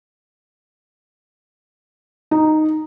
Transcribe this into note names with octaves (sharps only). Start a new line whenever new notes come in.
D#4